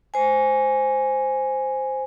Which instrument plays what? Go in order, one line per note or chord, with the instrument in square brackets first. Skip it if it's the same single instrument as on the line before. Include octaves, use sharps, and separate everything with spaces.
[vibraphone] C5 G#5